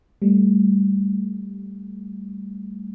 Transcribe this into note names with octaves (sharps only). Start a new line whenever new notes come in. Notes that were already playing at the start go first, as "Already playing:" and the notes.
G3 A3